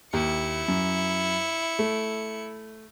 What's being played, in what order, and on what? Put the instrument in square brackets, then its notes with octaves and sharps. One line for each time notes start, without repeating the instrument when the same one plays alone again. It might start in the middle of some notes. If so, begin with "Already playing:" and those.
[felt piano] D#2 [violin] E4 C#7
[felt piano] F#2
A3